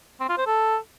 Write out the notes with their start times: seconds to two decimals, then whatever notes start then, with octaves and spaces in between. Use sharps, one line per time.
0.20 C4
0.29 F4
0.38 C5
0.47 A4